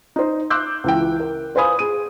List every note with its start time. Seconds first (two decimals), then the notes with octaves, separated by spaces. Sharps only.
0.16 D#4 C5
0.50 C6 D6 E6 F#6 G6
0.84 C#2 E3 G5
1.20 A#4
1.55 B4 C5 F5 G#5 B5 D#6
1.79 G#4 D#7